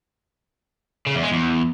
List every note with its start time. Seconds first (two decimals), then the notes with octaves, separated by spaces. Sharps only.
1.06 C#3
1.15 E2
1.23 G#3
1.32 E2